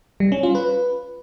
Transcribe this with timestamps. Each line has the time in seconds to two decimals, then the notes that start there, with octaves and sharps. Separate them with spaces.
0.20 G3
0.32 C#4
0.43 F4
0.55 B4